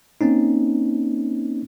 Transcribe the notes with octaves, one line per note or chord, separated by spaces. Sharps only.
A#3 C4 C#4 D#4